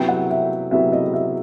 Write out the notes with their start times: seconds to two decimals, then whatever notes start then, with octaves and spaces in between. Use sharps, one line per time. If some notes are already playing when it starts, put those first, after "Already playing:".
Already playing: C3 F#3 B3 E4 G5
0.08 F#5
0.31 E5
0.71 C3 F#3 B3 E4 E5
0.92 D#5
1.14 E5